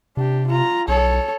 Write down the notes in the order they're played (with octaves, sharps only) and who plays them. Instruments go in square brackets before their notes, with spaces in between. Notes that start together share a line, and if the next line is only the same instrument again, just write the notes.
[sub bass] C3 [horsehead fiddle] D4 G4
[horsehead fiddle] F4 A#5
[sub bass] B1 [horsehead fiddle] A4 C#5